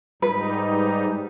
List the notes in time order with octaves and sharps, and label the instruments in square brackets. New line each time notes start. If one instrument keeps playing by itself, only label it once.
[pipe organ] G#2 G3 D#4 [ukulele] B4